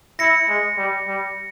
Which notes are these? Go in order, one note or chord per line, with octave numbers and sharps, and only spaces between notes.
E4 A#6 C#7
G#3
G3
G3